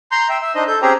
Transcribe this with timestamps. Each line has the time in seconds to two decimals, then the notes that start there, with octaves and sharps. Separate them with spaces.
0.12 A#5 C6 G6
0.29 E5 G5
0.42 E5
0.55 D4 D#4 C5 D#5
0.68 A4 G6
0.82 C4 C#4 G4 G#4 C5 A#5